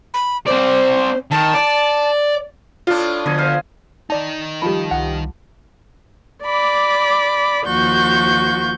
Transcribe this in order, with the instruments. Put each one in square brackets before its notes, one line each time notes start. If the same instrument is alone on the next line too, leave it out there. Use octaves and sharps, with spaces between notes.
[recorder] B5
[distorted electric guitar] C4 D5 [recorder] C5
[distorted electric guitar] D#3 [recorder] A5
[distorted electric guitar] D5
[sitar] A2 D4 [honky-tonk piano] F4
[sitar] F2 [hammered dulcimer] B2 D#5 G#5 [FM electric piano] D3
[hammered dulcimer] C5 F5
[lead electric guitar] D#3 D#4 [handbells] D5 A5
[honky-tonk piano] F3 G3 [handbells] B5
[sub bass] C2 [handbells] F#5
[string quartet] D5 B5 D6
D#2 F3 F#4 C#6 G6